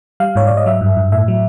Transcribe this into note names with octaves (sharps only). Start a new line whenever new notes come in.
G3 F5
G#2 C#5
G#2 D5
D#5
F#3 E5
G2
G2
A2 E5
F#3